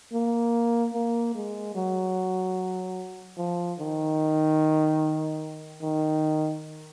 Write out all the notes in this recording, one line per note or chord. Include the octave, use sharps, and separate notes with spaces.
A#3
A#3
G#3
F#3
F3
D#3
D#3